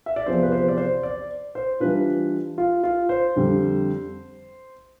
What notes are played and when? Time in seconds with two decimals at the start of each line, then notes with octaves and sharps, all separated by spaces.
0.06 E5
0.16 D5
0.26 E2 C3 F3 C5
0.43 B4
0.52 C5
0.68 D5
0.78 C5
1.03 D5
1.55 C5
1.80 E3 G3 D4 F4 B4
2.58 F4
2.83 F4
3.09 C5
3.36 F2 D3 G3